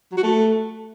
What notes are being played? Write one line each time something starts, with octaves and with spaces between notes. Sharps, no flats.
F#3
F#4
A3